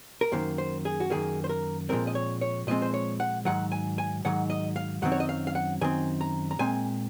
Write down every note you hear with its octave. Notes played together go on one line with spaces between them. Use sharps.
A#4
F#2 D#3 A#3 C5
C5
G#4
F#4
F#2 D#3 A#3 G#4
C5
A#4
A#2 F3 G#3 C4 A#4
D#5
C#5
C#5
A#2 F3 G#3 C4 D#5
C5
C#5
F#5
G#2 D#3 F#3 F#5
G#5
G#5
G#2 D#3 F#3 F#5
D#5
F5
F#2 D#3 F#3 C4 F#5
C#5
D#5
F5
F5
F#5
F#2 D#3 C4 G#5
A#5
A#5
A#2 G#3 C4 G#5